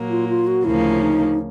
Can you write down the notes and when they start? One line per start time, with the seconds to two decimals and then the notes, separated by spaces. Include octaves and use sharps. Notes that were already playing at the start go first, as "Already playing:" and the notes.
Already playing: A#2 F#3 A#3
0.10 F4
0.29 F4
0.47 F#4
0.65 D2 C#3 F3 A#3 C#4 E4
1.01 D#4